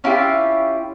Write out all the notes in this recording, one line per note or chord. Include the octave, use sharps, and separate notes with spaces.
C#4 E4 F4 G4